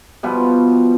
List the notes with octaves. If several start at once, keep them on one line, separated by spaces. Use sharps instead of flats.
B2 F3 G3 B3